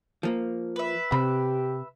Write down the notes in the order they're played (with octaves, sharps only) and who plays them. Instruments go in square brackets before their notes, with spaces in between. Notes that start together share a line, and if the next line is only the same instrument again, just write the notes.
[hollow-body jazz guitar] F3 A#3
[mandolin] B4 E5
[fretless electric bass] C3 [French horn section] G4 [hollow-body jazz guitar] B5